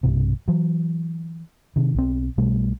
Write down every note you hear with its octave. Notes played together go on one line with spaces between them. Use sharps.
B1 G2 C3
E3 F#3
C3 D#3
B1 B2 C4
B1 B2 G3 A3